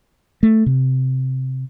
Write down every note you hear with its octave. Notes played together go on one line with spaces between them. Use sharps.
A3
C3